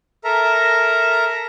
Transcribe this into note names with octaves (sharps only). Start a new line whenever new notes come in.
A4 A#4 E5 A#5